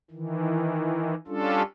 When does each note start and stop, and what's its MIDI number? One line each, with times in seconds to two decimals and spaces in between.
0.11 1.15 51
0.11 1.15 52
1.27 1.62 55
1.27 1.62 61
1.27 1.62 62
1.27 1.62 65
1.27 1.62 69